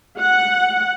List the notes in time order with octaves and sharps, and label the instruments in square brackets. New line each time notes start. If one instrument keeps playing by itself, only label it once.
[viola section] F#5